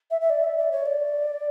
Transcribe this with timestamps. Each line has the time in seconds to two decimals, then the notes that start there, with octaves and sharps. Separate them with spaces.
0.10 E5
0.21 E5
0.29 D5
0.44 E5
0.57 D5
0.71 C#5
0.85 D5